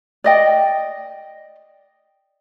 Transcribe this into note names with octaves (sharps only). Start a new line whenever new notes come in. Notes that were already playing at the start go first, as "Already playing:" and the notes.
D5 D#5 G5